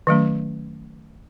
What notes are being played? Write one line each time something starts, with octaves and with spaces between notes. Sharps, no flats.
D#3 F#3 A3 C#4